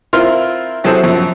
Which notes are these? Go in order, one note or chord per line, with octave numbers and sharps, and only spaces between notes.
C4 E4 F4 A#4 C6 F6
C3 F#3 E4 G#4 A4 C5
F#2 F3